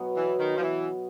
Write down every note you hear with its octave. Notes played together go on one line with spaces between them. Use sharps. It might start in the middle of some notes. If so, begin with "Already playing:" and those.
Already playing: B2 F#3 B3
E3
D#3
F3
E3